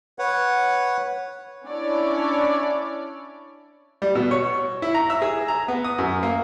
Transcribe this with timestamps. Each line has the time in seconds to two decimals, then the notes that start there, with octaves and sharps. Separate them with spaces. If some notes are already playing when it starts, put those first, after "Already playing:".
0.19 B4 C#5 F#5
1.66 C#4 D4 E4 C#5 D5
4.02 G3
4.15 B2
4.31 C#5
4.82 E4
4.94 A#5
5.10 E5
5.22 G#4
5.48 A#5
5.68 B3
5.84 D#6
5.98 F#2
6.23 A#3